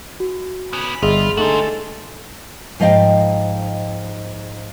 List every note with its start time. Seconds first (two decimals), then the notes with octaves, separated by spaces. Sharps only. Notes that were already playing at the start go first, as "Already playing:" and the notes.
0.20 F#4
0.73 B3 C#4 B5
1.03 G1 F4 G#4 D#5 E5
1.37 D3 G#3 A3 D#4 F#4 A4 C5 F#7
2.80 G#2 F3 D#5 F5 G5